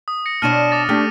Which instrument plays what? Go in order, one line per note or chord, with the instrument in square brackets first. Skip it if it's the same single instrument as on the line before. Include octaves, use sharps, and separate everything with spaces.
[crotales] D#6
A#6 C#7
[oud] B2 D4 C#5 [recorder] A5 [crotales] F6 D#7
[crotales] D6 A6 A#6
[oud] A3 G4 [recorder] D4 [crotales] F6